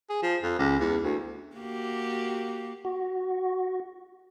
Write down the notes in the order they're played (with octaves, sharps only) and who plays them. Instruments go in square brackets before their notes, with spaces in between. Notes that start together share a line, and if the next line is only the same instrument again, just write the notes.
[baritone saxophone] G#4
F3
F2
C#2
E2
D2
[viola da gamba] A#3 F#4 G4
[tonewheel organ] F#4